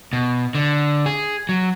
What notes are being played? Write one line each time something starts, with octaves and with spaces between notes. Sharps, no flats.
B2
D3
G#4
F#3